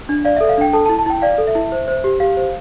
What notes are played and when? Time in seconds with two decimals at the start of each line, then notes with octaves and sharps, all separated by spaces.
0.09 D4
0.25 D5 F5
0.37 E5
0.41 A4
0.49 F5
0.58 D4 G5
0.73 A4 A5
0.86 A5
0.89 E4
0.99 A5
1.06 E4 G5
1.22 D5 F5
1.38 A4
1.47 E5
1.55 E4
1.72 C5
1.88 C5
2.04 G4
2.20 G4 F5
2.37 C5